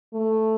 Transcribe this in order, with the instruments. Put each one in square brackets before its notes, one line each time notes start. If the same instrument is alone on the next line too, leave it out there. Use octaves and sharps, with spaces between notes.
[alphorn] A3